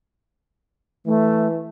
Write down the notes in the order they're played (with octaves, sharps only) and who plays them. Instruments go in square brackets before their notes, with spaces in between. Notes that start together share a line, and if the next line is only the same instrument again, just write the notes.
[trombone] E3 [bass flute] A3